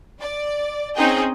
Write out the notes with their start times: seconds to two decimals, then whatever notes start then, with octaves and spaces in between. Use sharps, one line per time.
0.20 D5
0.96 C4 C#4 D#4 G#4 D#5 G5